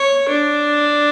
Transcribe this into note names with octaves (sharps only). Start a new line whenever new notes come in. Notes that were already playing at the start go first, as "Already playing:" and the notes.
Already playing: C#5
D4